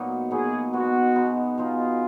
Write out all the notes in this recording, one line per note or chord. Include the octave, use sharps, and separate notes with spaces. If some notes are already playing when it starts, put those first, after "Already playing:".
Already playing: A#2 F#3 B3 D#4
A#2 F#3 B3 D#4 G#4
B2 G#3 B3 D#4 F#4
B2 G#3 B3 D#4
B2 G#3 D#4 F4 G#4